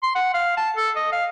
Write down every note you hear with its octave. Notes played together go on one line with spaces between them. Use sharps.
C6
F#5
F5
A5
A4
D#5
F5